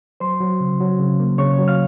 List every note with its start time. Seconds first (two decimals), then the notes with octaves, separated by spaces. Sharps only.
0.20 F#3 C5 C6
0.40 F#3
0.60 C#3
0.80 F#3
1.00 C#3
1.20 A#3
1.38 C#3 C#5 C#6
1.59 F#3
1.68 F5 F6